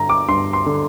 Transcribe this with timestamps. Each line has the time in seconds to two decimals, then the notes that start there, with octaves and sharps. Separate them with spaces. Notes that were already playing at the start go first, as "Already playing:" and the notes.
Already playing: G2 D3 A#5
0.09 D6
0.28 G2 C6
0.53 C6
0.66 D3